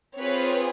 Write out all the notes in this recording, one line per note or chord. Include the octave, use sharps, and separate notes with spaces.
C4 F4 G#4 B4 C#5